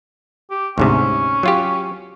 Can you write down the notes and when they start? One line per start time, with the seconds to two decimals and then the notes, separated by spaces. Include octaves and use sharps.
0.51 G4
0.78 D2 G#2 C3 C#4
1.43 F#3 F4 G4